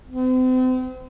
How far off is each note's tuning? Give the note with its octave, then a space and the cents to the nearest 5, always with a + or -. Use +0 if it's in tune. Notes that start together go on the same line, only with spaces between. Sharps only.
C4 -40